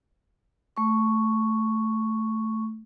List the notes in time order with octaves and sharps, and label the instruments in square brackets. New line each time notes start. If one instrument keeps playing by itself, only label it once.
[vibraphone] A3 C#6